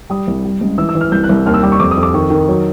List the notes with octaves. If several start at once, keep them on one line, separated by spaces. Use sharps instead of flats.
G3 D#6
C2
G3
C#2
E3 E6
E6
E3
F6
C2 G6
F#6
C2
D#2 F6
E6
G3 D6
C#6
F2 D6
D#6
F2
D6
D#3 C#6
D#3
F#3